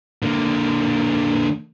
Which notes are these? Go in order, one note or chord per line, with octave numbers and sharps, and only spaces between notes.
D3 A#3